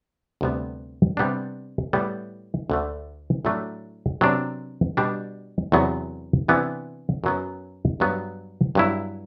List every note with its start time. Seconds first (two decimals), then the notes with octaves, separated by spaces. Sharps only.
0.41 D2 C3 G3 B3
1.17 C3 G3 B3 D4
1.93 A2 G3 B3
2.70 D2 D3 A3
3.45 A2 F#3 A3 D4
4.21 C3 F#3 B3 D4
4.97 B2 G3 D4
5.72 E2 C3 F#3 B3
6.48 C3 E3 B3 D4
7.24 F#2 F#3 B3
8.00 G2 F#3 B3
8.75 G2 F#3 B3 E4